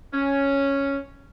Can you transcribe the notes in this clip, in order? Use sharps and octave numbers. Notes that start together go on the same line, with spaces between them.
C#4